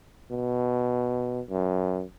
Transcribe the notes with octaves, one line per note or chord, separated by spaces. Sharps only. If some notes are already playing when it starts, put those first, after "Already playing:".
B2
F#2